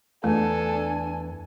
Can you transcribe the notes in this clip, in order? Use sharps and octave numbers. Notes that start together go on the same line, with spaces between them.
E2 A3 D4 A4 G#5